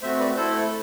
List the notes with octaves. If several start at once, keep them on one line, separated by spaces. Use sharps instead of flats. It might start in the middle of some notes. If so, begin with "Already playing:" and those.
A3 C4 F#4 C5 E5
B4 D5
A3 E4 A4 C5